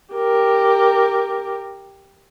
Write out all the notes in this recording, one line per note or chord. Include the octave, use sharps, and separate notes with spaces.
G4 A#4